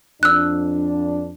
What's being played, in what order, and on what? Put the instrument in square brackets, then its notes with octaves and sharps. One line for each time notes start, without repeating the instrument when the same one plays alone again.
[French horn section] F2 D4 [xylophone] E6 F#6